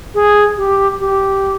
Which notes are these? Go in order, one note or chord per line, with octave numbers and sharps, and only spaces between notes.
G#4
G4
G4